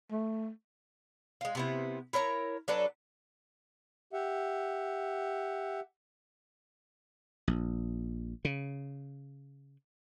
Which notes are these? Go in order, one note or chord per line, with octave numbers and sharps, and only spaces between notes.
A3
G#3 F4
C3 B3 E4
E4 A#4 C#5 A#5
F#3 D4 A4 B4
G4 E5 F#5
A#1
C#3